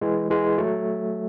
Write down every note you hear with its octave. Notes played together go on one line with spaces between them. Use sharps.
E3 G#3
E3 G#3
F#3 A3